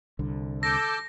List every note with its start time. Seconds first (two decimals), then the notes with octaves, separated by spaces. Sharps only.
0.19 C2 D3
0.63 A4 D6 E6 G6 A#6